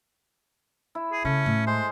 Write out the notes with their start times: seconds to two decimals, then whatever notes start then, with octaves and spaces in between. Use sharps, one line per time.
0.95 E4
1.12 G#4
1.25 C#3 A3 C#4
1.46 A2
1.67 G#3 C5